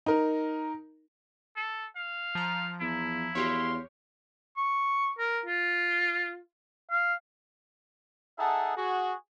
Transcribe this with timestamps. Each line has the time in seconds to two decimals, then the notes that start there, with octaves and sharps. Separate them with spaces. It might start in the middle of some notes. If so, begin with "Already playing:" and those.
0.06 D#4 A#4
1.56 A4
1.96 F5
2.35 F3 A#5
2.81 E2 E4
3.35 E2 F#4 G4 C#5 F5 C6
4.57 C#6
5.18 A#4
5.46 F4
6.91 F5
8.39 D#4 G#4 A4 E5 F#5 A5
8.77 F#4 G#4